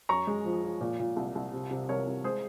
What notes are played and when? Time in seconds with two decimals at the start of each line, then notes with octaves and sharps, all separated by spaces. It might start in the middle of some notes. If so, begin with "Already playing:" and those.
0.09 F#2 A#5 C#6
0.27 G#3
0.45 F3
0.64 F3
0.81 A#2
0.99 A#2
1.16 C2
1.35 C2
1.53 C3
1.71 C3
1.89 C2 A#4 C#5
2.07 C2
2.24 G#3 G#4 C5